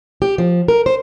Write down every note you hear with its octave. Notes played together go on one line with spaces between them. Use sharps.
G4
F3
A#4
C5